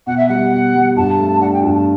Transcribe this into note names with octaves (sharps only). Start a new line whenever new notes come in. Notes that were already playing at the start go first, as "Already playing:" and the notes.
B2 F#5
E5
G3 F#5
B2
G3
G2 A5
A3
D4 F#5
G5
G2 A5
A5